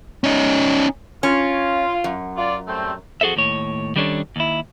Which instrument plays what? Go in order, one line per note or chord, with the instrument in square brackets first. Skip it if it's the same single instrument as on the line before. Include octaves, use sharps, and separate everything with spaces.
[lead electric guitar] C#4 D#4
[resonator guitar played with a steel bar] C#4 [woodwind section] F4
[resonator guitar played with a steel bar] F#2
[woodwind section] F4 D5
G3 A3 C4
[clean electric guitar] F2 F#4 G#4 A4 C5 E5
D#2 A2 C#5
D#3 G3 C#4 D4 A4 C#5
D#2 E4